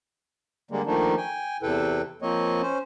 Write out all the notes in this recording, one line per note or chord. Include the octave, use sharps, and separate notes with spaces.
D3 G3 G#3 A#3
D#3 F3 A3 A#3 D4 D#4
G5 G#5
E2 C3 E4 A4 B4 G5
F3 A#3 C4 C#5 D#5
C#4 C5